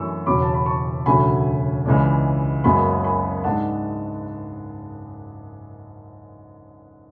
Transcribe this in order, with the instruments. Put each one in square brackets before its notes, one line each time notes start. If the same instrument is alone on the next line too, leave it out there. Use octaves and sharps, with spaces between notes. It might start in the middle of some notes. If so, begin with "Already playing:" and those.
Already playing: [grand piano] F#2 E3 A3 D4 C#6 E6
E1 E2 C#3 F#3 C#4 B5 D6
A5
B5
A5 C#6
E1 D2 C#3 F#3 G#5 B5
C#2 C#3 E3 G#3 D4
F#1 F#2 C#3 G#3 B3 G#5 B5
G#5 B5
G#2 G#3 D4 F#5 A5